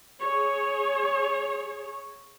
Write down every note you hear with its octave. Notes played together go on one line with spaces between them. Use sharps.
G#4 C#5